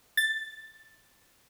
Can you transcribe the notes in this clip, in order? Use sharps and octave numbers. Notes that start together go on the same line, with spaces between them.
A6